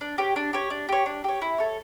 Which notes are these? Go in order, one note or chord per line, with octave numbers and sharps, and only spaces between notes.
D4
G4 C#5
D4
G4 C#5
D4
G4 C#5
D4
G4 C#5
E4
A4 C#5